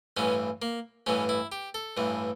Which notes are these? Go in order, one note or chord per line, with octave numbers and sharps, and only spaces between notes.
A1 G2 E3 C#4
A#3
A1 G2 E3 C#4
E4
G4
A4
A1 G2 E3